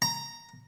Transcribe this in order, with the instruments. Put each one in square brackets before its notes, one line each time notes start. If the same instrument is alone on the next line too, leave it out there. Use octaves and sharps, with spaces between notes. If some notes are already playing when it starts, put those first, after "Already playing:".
[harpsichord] A#5